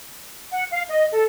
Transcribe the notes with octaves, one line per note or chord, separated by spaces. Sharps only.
F#5
F5
D#5
A4